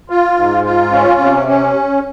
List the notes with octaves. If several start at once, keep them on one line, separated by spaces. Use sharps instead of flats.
F4
G#2
F4
C#4
C3
C#4